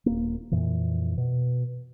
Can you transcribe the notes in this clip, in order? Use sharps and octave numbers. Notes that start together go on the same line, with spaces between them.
D#1 A#3
F2 A#2 E3
B2